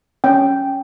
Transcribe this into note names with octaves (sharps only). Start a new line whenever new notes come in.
C#4 G5